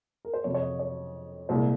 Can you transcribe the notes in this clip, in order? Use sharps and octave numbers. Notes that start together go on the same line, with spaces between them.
A#4
C5
F2 C3 F3 C#5
C#5
D#5
C#5
C2 A#2 G#3 C5